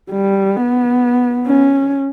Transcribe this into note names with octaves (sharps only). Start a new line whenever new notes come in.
G3
B3
C#4